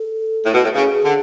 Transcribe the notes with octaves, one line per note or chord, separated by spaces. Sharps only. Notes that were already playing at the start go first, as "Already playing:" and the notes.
Already playing: A4
A2
B2
A2
C#3 G#4
D3